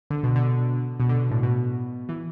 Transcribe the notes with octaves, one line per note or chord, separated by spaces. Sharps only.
D3
B2
D3
B2
D3
A2
B2
E3